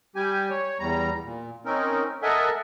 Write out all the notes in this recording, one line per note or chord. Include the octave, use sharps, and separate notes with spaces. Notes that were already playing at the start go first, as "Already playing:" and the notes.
G3 G4 G#5
C#5
E2 G3 A#5
A#2
C4 C#4 D#4 A#4
A4 A#4 D#5 E5 F#5 G#5